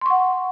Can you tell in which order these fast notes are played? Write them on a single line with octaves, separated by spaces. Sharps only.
C6 C#6 F#5